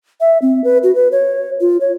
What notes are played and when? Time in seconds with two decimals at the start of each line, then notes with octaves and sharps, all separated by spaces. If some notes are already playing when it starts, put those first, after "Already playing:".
0.21 E5
0.42 C4
0.64 B4
0.83 F#4
0.95 B4
1.12 C#5
1.61 F4
1.81 C#5